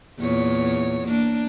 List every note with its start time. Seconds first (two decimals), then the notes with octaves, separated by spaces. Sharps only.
0.19 E2 A#2 C#5
1.04 A#3 D4